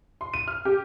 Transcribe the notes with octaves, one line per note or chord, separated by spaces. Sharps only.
C6
D#7
F6
G4